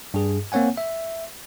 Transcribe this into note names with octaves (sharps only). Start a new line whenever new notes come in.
G2 G#4
A#3 C4 C#5 F#5 G#5
E5